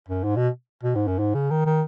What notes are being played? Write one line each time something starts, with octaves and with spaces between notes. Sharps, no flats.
F#2
G#2
B2
B2
G#2
F#2
G#2
C#3
D#3
D#3